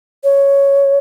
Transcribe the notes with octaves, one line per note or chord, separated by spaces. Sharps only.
C#5